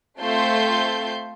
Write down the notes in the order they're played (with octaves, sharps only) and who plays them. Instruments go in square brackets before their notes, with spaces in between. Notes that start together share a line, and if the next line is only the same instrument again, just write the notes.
[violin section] A3 C4 F4 C6 G6